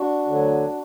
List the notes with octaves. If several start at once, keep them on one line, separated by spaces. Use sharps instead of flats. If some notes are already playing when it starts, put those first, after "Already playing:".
Already playing: D4 F#4
D2 D3 F#3